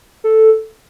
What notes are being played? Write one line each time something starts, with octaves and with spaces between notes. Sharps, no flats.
A4